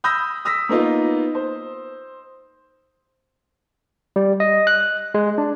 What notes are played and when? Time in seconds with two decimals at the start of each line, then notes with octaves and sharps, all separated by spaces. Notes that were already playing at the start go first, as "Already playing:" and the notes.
0.04 B5 D#6 E6 G6 A#6
0.45 D#6 E6 A#6 B6
0.69 A#3 B3 D#4 F4
1.35 C5
4.16 G3
4.40 D#5
4.67 F#6
5.14 G#3
5.38 D4